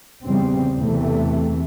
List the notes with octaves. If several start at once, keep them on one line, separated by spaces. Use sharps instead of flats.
E2 C#3 G3 C4
E2 C3 E3 A3